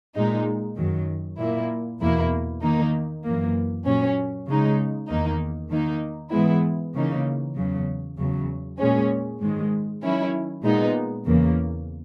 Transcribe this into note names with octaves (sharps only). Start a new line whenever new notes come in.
A#2 G#3 D#4
F#2 D#3 F#3
A#2 A#3 E4
E2 B2 A#3 E4
D#3 A#3 D#4
F#2 E3 A#3
A#2 F#3 C#4
C#3 G#3 D#4
E2 D#3 A#3 D#4
D#3 A#3 D#4
G#2 E3 G#3 B3 E4
C#3 E3 A#3 D#4
E2 C#3 F#3
E2 C#3 F#3
A#2 G#3 C#4
G#2 D#3 G#3
D#3 F#3 C#4 E4
A#2 G#3 B3 D#4
E2 C#3 E3 A#3